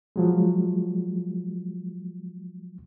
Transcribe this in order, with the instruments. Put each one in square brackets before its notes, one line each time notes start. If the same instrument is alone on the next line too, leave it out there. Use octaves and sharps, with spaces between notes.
[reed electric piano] F3 F#3 G#3